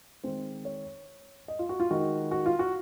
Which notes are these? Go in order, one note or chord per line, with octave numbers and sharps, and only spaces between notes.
D#3 G#3 C4 C5
C#5
D#5
F4
F#4
F4
D#3 G#3 D#4 F#4
F#4
F4
F#4